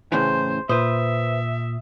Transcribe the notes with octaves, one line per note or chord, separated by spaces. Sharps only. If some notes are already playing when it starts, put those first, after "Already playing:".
A2 C#3 E3 C5
A#2 B4 C5 E5 D#6